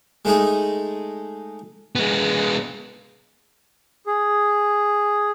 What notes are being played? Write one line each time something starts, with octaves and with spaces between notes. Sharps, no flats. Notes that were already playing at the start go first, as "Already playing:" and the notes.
G#3 A3 D#4 G#4
G#3 B3
G#4